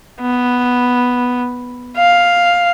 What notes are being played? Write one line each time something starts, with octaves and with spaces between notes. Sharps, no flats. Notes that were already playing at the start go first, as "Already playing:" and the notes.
B3
F5